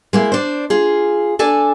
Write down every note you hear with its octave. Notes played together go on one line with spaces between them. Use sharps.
G#3 A#3 E4
D4 C5
F4 G#4
D4 A4 G#5 A5